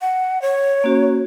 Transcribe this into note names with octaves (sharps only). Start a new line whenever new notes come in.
F#5
C#5
A#3 C#4 F#4